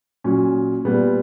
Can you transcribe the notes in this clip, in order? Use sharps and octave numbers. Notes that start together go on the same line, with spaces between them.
A#2 F#3 C#4
A#2 G3 B3